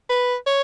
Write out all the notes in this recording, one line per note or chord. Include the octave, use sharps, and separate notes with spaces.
B4
C#5